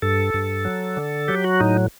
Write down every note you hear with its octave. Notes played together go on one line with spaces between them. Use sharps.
G2 A4
G2
F#3
D3
F#3 G4
F#4
A2 D#4